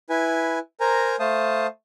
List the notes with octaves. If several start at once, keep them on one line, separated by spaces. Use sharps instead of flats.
E4 B4 G#5
A#4 C5 G#5 A#5
A3 C5 F5 A5 D#6